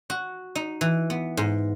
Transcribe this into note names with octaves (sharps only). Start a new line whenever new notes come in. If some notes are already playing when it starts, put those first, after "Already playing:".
F#4
D#4
E3
B3
G#2